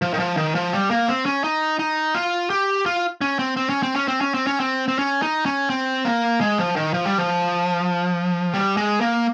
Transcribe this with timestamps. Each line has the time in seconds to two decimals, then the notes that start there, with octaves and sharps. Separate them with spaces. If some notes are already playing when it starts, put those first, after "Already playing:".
0.02 F3
0.14 D#3
0.20 F3
0.37 D#3
0.55 F3
0.73 G3
0.91 A#3
1.08 C4
1.26 C#4
1.44 D#4
1.79 D#4
2.15 F4
2.50 G4
2.86 F4
3.21 C#4
3.39 C4
3.57 C4
3.70 C#4
3.83 C4
3.96 C#4
4.08 C4
4.21 C#4
4.34 C4
4.47 C#4
4.60 C4
4.88 C4
4.99 C#4
5.22 D#4
5.46 C#4
5.70 C4
6.05 A#3
6.41 G#3
6.58 F3
6.76 D#3
6.94 F3
7.06 G3
7.18 F3
8.54 G3
8.77 G#3
9.01 A#3